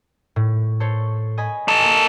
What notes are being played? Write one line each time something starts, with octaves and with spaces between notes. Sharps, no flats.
A2
A4 C5 C#5
D#5 G#5 B5
D#4 A4
A#3